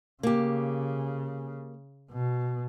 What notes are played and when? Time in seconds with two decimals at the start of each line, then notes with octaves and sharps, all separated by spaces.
0.23 C#3 A#3 G4
2.11 B2